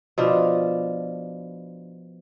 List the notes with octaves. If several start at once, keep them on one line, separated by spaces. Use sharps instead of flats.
B2 F3 D4